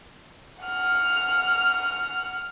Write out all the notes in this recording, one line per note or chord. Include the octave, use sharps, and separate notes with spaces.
F#5 F6